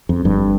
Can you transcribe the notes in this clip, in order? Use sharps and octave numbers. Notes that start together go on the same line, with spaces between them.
F2
G1 G2